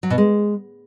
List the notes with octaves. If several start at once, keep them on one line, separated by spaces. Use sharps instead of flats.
F#3
B2
G#3